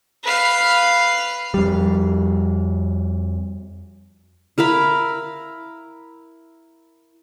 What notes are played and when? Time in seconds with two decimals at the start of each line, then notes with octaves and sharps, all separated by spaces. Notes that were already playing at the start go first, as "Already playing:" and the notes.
0.24 B4 F5
1.54 F2 G3
4.58 E4 A#4 F5 B5